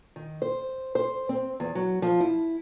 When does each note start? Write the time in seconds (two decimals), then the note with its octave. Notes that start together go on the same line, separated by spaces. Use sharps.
0.16 D#3
0.42 C5
0.95 C5
1.29 C4
1.60 E2
1.75 F#3
2.02 F3
2.20 E4